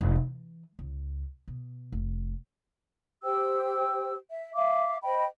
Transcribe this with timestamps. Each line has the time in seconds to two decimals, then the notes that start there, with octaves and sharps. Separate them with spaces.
0.01 F1
0.16 E3
0.79 C#2
1.48 B2
1.92 F1
3.23 G4 C5 G5 E6
4.30 E5
4.54 E5 F5 D6
5.03 C5 D#5 G5 B5